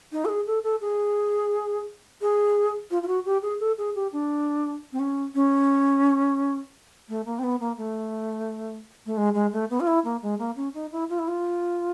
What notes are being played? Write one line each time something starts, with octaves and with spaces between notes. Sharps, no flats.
D#4
A4
G#4
A4
A4
G#4
G#4
F4
F4
F#4
G4
G#4
A4
G#4
G4
D4
C4
C#4
C#4
A3
A#3
C4
B3
A#3
A3
A3
G#3
G#3
A3
B3
F4
E4
A#3
G#3
A#3
C#4
D#4
E4
F4
E4
F4